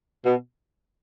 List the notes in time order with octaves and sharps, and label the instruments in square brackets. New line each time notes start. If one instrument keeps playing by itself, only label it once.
[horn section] B2